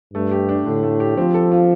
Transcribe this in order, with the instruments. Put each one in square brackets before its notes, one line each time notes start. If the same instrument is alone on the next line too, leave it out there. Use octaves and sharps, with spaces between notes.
[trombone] G2 [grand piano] A3
[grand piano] G4
D4
[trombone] A2 [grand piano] D3
[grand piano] A3
G4
[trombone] F3 [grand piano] C4
[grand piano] A4
F4